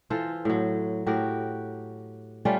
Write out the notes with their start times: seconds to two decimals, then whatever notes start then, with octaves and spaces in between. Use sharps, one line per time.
0.10 E3 F4 A4 C5
0.45 A2 F#3
1.06 A2 F#4 G4 A#4
2.45 G3 A3 C#4 F4